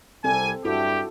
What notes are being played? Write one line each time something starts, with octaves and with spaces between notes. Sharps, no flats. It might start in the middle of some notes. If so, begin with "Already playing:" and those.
C2 G3 C4 A4 G#5
G2 E4 F#4 G4 A4